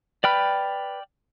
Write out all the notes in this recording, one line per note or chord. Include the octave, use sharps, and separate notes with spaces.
B4 D5 G5 B5 F6